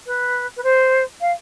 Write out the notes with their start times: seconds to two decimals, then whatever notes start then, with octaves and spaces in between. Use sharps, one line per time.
0.06 B4
0.57 B4
0.63 C5
1.21 F5